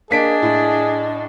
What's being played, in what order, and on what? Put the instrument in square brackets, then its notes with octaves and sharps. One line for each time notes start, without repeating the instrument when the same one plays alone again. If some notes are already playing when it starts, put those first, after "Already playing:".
[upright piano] A#3 B6 D7 [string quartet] D4 [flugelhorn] G#4 [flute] D#5
[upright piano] A2